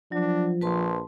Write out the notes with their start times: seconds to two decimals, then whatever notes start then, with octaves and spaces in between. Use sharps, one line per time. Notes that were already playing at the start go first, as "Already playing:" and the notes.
0.12 F3 F#3 D4
0.61 A#1 B4 A5 C6